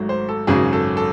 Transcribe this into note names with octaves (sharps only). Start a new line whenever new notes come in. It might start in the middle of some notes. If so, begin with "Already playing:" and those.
Already playing: G#1 G#2 F#3 A3
C5
A4
G#1 F#2 C#3 F#3 G#4
A4
A4